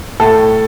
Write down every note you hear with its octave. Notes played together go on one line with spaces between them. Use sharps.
A2 A4